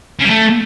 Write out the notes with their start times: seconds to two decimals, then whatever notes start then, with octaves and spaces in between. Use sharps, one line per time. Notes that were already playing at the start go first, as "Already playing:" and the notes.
0.19 C#3
0.25 G3
0.30 A3